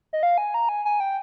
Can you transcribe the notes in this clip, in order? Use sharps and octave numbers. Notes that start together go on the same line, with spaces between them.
D#5
F5
G#5
A#5
G#5
G#5
G5